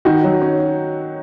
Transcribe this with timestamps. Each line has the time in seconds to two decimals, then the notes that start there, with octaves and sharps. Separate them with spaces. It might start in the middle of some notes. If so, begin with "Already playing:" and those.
0.05 D#3 D#4 F#4
0.24 F#3
0.42 C#4